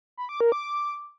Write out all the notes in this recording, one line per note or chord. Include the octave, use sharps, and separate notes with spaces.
B5
D6
A#4
D6